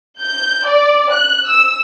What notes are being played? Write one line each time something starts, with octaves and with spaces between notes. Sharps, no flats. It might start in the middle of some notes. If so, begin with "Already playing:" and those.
G6
D5
F#6
E6